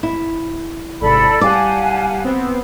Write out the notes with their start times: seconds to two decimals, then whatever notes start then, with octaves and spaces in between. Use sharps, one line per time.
0.03 E4
1.01 G#1 C3 A4 D5 B5
1.41 G3 G4 D5 F5 F#5 G#5 A5
2.24 B3 C4